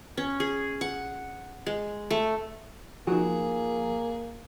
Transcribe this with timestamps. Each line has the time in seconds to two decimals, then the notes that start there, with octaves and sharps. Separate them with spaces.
0.17 C#4
0.40 G#4
0.81 F#5
1.66 G#3
2.11 A3
3.07 F3 A#3 D#4 F#4 G#4